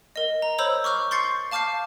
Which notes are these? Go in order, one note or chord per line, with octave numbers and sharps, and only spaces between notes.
A#4 D#5
A#5
C5 C#5 B5 E6 G6
C#6 D6 F6 G6
C6 C#6 G6 A6 C7 C#7
F5 A5 D6 F6 G6 C7